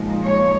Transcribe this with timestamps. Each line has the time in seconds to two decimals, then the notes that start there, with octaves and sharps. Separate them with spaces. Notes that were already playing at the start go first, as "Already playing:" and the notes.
Already playing: A#2 F3 G#3 D#4
0.24 C#5